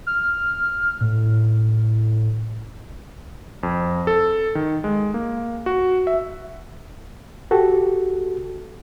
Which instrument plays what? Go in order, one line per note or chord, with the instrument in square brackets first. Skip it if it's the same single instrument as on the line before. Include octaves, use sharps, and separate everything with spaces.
[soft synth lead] F6
A2
[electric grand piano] F2
A4
D#3
G#3
A#3
F#4
E5
[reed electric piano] F#4 G4 A4